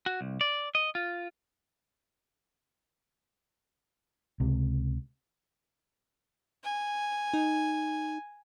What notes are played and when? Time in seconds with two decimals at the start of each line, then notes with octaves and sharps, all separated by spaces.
0.06 F#4
0.21 C2
0.41 D5
0.75 D#5
0.95 F4
4.40 C#2 C3
6.64 G#5
7.34 D#4